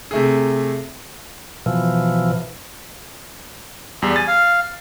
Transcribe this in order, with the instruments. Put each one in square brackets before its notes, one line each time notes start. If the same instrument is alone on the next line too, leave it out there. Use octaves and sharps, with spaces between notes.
[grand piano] C3 A3 G#4
[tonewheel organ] B2 E3 F3
[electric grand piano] E2 G3
[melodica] G#5 [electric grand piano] A6
[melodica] F5